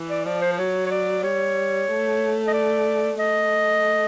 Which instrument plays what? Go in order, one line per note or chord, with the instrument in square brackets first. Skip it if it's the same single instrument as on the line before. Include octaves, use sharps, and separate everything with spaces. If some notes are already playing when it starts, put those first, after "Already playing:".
Already playing: [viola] E3
[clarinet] D5
[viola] F3 [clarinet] D5
[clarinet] C5
C5
[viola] F#3 [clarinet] C#5
[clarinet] C#5
D5
[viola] G3 [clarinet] C#5
[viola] A3
[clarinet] D#5
D5
[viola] A3 [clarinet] D#5